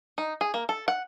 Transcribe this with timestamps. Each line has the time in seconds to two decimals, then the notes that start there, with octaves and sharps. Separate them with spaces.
0.18 D#4
0.41 G#4
0.54 A#3
0.69 A4
0.88 F#5